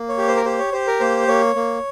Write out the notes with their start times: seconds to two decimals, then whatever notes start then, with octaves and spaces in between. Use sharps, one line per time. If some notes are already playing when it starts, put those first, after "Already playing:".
Already playing: A#3
0.09 C#5
0.18 G4
0.28 C5
0.37 A#4
0.45 G4 C5
0.59 C#5
0.72 G4 C5
0.87 A#4
1.00 A#3 C5
1.28 A#3 C#5
1.55 A#3